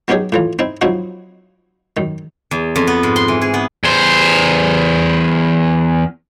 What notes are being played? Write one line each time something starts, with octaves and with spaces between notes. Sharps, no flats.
F#3 B3 C#4 D#4 G4 G#4
A2 E3 F4
C4 D#4 E4
F3 F#3 C4 D#4 E4 F#4
F#2 D#3
E2
F2
B3
G#2
C6
E3
G#4
B3
E2 C5